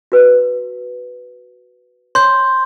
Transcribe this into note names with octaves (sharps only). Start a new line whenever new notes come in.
F#4 B4
C#5 C6 G6